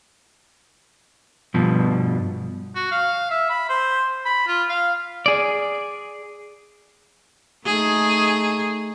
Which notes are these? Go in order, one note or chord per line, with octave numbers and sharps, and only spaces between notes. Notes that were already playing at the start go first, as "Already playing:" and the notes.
G2 B2 F3
F#4
F5
E5
B5
C5
B5
F4
F5
G#4 D5
A3 D#4 G#4